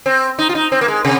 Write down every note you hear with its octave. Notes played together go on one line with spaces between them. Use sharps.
C4
D#4
F4
D#4
C4
A#3
G#3
C3